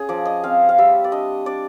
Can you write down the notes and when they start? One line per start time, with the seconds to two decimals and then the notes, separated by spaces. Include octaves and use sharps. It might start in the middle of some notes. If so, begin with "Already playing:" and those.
Already playing: C#4 G#4
0.09 F3 D5
0.25 D#5
0.44 C4 F5
0.69 F5
0.78 G3 E5
1.04 D5
1.12 D4 D#5
1.46 D4 D5